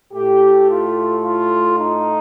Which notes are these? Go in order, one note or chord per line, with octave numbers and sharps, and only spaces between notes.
A2 A3 G4
F4
F4
D#4